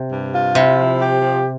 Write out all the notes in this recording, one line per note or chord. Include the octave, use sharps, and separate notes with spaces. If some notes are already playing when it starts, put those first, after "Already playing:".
Already playing: C3
G2
F4
C3 E4
F3
G4
F3